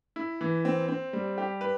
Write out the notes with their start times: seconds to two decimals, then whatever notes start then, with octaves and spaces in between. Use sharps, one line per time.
0.16 E4
0.41 E3
0.65 C4
0.88 C4
1.13 G3
1.38 G4
1.61 B4